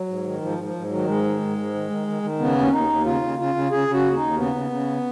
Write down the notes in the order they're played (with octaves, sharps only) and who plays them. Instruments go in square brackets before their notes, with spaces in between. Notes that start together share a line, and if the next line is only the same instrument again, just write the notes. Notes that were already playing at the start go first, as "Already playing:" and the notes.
Already playing: [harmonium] F#3
G#2
D#3
G#2 F3
G#2
F3
G#2
D#3 F#3
G#2 G#3
D#3
G#2
G#2
D#3
D#3
D#3
D#3
C#3 B3
D#2
C#4
D#2 D#4
D#2
C#3 F4
C#3
C#3 F4
C#3
C#3 G#4
C#3
F#4
D#2
D#4
D#2
C#3 B3
C#3
C#3